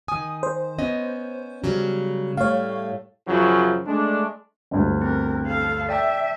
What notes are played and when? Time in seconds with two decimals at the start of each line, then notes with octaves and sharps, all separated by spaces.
0.08 D#3 G#5 D#6
0.43 C5
0.79 B3 C#4 D#5
1.63 C#3 F#3 G3
2.37 A2 G3 A3 C#5 F5
3.27 F#2 C#3 F3 F#3
3.86 G#3 A3 D4
4.71 G1 D2
5.02 C4 A#4
5.46 A4 F5
5.89 D5 E5 G5 A5